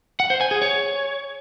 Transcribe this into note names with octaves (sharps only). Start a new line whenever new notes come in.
F#5
C5
G#5
G#4
C#5